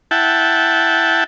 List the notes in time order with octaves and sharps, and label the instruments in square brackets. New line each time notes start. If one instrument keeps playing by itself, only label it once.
[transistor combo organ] E4 F#5 G5 A5